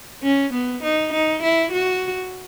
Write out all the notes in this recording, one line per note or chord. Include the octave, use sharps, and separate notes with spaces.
C#4
B3
D#4
D#4
E4
F#4